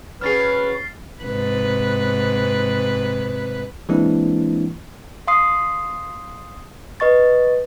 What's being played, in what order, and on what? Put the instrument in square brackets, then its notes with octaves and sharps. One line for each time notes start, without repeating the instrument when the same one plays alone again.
[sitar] F#3 C#4 G#4 [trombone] B4 [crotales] F6 A6 C7
[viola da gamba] G#2 C3 B4
[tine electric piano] E3 G#3 A#3 C4 D4 E4
[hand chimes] F5 C6 D#6 C7
B4 D#5 C#6 A6